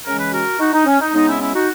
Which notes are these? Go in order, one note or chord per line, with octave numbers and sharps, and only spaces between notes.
C#3 E3 G#3 C#4 A#4
B4
F#4 A#4
D#4 F#4
D#4
C#4
D#4
C#3 G#3 B3 D#4
C#4 E4
C#4 E4
D#4 F#4